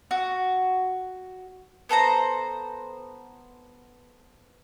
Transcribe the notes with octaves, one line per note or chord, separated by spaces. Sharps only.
F#4
B3 A4 C5 A#5